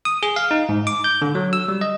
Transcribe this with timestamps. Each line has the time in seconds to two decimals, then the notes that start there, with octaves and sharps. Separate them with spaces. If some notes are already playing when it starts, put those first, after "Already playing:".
0.05 D#6
0.23 G#4
0.36 F5
0.51 D#4
0.69 G#2
0.87 D6
1.04 G6
1.22 D3
1.35 F#3
1.53 E6
1.68 G3
1.81 D#5